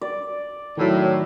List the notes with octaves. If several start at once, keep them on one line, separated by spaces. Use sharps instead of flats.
D5
A2 D#3 F#3